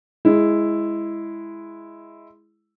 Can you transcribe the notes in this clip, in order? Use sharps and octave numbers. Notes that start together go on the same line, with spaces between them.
G#3 E4